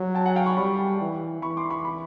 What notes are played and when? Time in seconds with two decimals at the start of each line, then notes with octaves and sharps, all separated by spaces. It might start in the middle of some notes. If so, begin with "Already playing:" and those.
Already playing: F#3
0.15 G5 A5
0.26 F#5 G#5
0.36 F5 G5
0.46 B5 C#6
0.57 G3 B5 C#6
1.01 E3
1.42 E3 B5 C#6
1.57 C6 D6
1.70 B5 C#6
1.85 B5 C#6